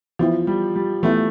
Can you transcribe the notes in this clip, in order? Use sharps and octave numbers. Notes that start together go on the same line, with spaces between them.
E3 F3 B3 E4
G3
G3
E3 A3 B3 E4